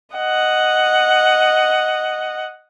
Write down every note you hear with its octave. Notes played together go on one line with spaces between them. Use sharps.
D#5 F#5